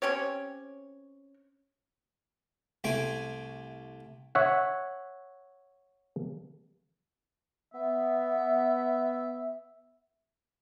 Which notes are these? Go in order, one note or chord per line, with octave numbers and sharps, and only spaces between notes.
C4 C#4 G4 C#5
C2 A3 C4 G5 G#5
C#5 E5 F#5
B3 E5